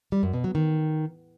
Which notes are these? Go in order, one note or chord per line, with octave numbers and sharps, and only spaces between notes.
G3
F#2
B2
F#3
D#3